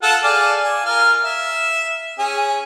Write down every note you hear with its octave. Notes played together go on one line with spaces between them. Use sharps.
F4 A4 F#5
G#4 D5 F5
G#5
F4 A#4 F6
E5
C#4 G#4